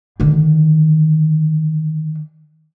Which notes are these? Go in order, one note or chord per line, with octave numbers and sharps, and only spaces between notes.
D3 D#3